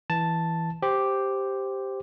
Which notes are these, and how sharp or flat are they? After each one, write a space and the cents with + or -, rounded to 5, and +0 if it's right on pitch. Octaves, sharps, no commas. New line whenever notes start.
E3 +0 A5 +0
G4 +0 C5 +0